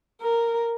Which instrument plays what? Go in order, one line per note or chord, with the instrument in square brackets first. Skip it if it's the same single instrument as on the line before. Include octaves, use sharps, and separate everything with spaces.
[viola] A#4